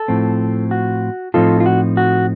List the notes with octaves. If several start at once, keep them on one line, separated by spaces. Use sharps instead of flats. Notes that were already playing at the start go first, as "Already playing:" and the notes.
Already playing: A4
A2 F3 C4
F#4
A2 F3 C4 D#4 F4 A4
F4
F#4
F#4